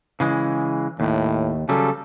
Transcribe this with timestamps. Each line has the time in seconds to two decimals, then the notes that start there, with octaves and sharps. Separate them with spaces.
0.20 C#3 E3 G#3
1.00 D#2 A2
1.69 C#3 F#3 G3 A4